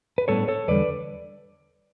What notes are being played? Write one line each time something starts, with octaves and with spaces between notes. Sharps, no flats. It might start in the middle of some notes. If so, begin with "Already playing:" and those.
B4
A2 G3 B3 D4 A4 C#5
A4 C#5
E2 D3 G3 B4 D5